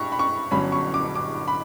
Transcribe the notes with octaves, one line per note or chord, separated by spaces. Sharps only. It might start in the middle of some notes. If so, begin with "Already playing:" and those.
Already playing: G2 G5 C#6
B5
C#6
G1 G2 F#3 C#4 B5
C#6
D6
D6
B5